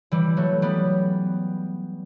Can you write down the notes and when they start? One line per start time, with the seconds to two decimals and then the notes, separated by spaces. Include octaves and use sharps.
0.12 E3 G3
0.37 F#3 A3
0.62 G3 B3